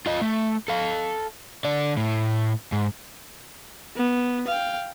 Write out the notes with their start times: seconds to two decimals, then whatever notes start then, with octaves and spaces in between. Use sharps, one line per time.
0.06 F4 D#5
0.21 A3
0.68 A4 F5
1.65 D3 D5
1.97 A2
2.72 G#2
3.96 B3
4.48 F5 G5